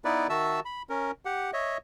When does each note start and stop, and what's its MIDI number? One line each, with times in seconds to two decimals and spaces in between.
0.05 0.27 59
0.05 0.27 63
0.05 0.27 64
0.05 0.27 71
0.05 0.27 74
0.30 0.60 51
0.30 0.60 66
0.30 0.60 76
0.30 0.60 81
0.30 0.60 88
0.65 0.82 83
0.90 1.11 61
0.90 1.11 70
1.25 1.51 67
1.25 1.51 78
1.53 1.78 73
1.53 1.78 75
1.53 1.78 76